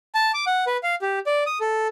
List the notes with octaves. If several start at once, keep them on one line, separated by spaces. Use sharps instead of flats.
A5
D6
F#5
B4
F5
G4
D5
D#6
A4